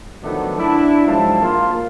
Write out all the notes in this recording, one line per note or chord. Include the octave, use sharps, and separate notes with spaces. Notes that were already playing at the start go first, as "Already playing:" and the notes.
D#3 F3 F#3 A3 B3 D4
D4 E4
G#2 F3 F#3 F5 A5
A#3 F4